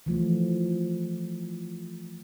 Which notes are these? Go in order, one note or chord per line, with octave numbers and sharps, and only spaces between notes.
E3 F3 A3